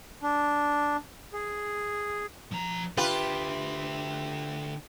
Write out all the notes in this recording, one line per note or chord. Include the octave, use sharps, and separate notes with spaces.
D4
G#4
F3 A#5
D3 F4 G4 B4 E5